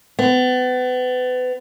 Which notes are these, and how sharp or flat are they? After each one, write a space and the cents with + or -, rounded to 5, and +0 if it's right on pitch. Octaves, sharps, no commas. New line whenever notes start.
B3 +35